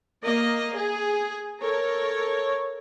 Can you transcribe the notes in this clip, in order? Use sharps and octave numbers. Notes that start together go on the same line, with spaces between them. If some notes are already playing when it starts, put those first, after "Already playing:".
A#3 D#5
G#4
A4 A#4 C#5